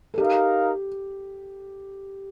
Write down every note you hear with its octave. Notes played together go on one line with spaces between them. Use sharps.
A4
D#4 G4 A#4 F5